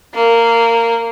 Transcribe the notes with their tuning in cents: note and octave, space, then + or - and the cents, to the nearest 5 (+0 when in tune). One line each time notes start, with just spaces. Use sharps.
A#3 -15